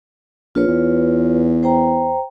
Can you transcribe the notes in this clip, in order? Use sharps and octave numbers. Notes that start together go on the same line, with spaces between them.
A#1 F4 B4 C#5
E2
C5 G5 A#5